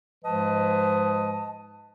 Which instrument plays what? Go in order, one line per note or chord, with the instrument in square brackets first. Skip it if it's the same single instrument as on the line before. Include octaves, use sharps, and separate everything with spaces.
[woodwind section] G#2 F3 G#3 B4 D#5 A5